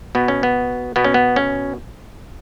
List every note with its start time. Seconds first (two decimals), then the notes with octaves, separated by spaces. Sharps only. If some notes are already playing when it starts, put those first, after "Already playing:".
0.15 B2 B3
0.28 C#4
0.43 B3
0.96 B2 B3
1.04 C#4
1.14 B3
1.36 C#4